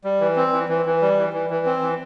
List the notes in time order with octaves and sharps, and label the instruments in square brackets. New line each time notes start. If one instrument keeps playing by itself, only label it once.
[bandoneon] G3
E3
C4
E3
E3
E3
G3
E3
E3
E3
C4
E3